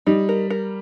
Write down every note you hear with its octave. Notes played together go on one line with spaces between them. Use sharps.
G3 D#4
A#4
A#4